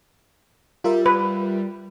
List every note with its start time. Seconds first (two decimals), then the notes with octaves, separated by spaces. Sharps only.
0.84 G3 F4 A#4 E5
1.06 B4